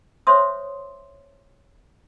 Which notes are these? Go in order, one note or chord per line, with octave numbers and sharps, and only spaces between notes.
C5 C#5 E5 C6 D#6